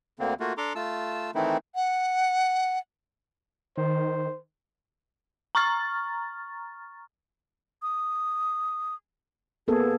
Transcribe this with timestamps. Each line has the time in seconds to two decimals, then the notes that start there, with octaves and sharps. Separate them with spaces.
0.19 D2 D3 A#3 C4
0.40 A3 A#3 F4 F#4
0.57 D4 A4 A#5 C6 D6
0.75 A3 F4 A5 E6
1.35 D#3 E3 A3 C4 D#4 E4
1.75 F#5
3.77 D#3 C5
5.55 A#5 C#6 F6 A6
7.82 D#6
9.68 A#3 B3 G#4 A4